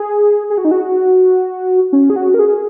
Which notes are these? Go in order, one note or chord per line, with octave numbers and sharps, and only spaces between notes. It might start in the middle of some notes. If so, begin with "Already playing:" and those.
Already playing: G#4
G#4
F#4
D#4
F#4
C#4
G#4
F#4
A#4
G#4